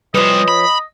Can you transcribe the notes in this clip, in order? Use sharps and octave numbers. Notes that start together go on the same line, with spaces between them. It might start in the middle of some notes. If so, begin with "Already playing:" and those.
F3 G3 C#4 B4 C5 D#5
B5